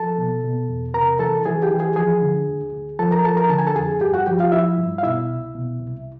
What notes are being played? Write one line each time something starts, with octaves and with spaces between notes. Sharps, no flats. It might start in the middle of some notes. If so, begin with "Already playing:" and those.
Already playing: F3 A4 A5
B2
B2
E2
C3 A#4 A#5
E3 A4 A5
E3 G#4 G#5
G4 G5
E3
G#4 G#5
F3 G#4 G#5
D3
D2
D2
F3 A4 A5
A#4 A#5
F3 A4 A5
A#4 A#5
D3 A5
G#5
A4 A5
F2 G#4 G#5
G2 G4 G5
F#4 F#5
F3 G4 G5
F4 F5
F3 E4 E5
G2
F5
B2 E4 E5
C2
B2
C2